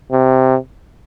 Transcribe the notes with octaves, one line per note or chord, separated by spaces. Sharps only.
C3